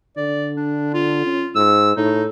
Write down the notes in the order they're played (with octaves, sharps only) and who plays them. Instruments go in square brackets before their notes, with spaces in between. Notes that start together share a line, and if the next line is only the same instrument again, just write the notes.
[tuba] D3 [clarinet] D5
[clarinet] D4
F4
[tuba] C#4
[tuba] G#2 [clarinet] E6
[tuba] A2 [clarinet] D#4